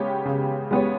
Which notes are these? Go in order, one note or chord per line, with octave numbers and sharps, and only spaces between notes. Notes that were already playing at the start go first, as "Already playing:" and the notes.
Already playing: C#3 G#3 B3 G4 C#5
C#3
G#3 B3 G4 C#5